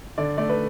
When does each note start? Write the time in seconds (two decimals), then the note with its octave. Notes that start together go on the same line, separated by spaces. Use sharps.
0.18 D3 D5
0.37 A3 D5
0.49 B4